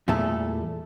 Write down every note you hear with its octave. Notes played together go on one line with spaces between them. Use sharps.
E2 A#2 G3 A3 A4